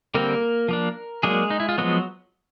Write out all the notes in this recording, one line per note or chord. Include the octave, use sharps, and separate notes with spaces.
D3 G3 A#3 C4 A#4
F3 A#3 D4
F#3 G#3 A#3 D4 G#4
D#4
E4
F4
F3 F#3 G#3 B3 F#4